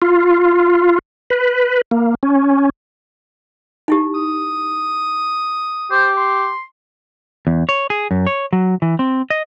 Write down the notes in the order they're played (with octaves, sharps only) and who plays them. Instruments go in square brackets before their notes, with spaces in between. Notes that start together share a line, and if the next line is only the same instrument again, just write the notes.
[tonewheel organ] F4
B4
A#3
C#4
[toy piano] D#4 E4 G4
[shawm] D#6
[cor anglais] G4 [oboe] C5
[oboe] C6
[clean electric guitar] E2
C#5
G#4
F#2
C#5
F#3
E3
C4
D#5